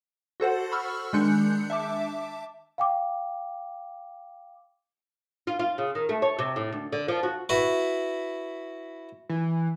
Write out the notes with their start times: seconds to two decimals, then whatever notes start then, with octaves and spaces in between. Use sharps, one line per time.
0.40 F#4 A4 C5 F#5
0.72 B5 C#6 E6 F6
1.13 D#3 G#3 D4 F#6 G6 C#7
1.70 E5 A5 D6
2.78 F5 G5 D6
5.47 F4
5.59 F4
5.78 C#3
5.95 D#3
6.09 A3
6.22 C#5
6.39 C3
6.56 A2
6.72 D2
6.93 D3
7.08 F3
7.23 F#4
7.49 E4 F#4 B4
9.29 E3